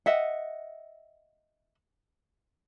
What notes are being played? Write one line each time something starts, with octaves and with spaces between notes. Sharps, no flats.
D#5 E5 F#5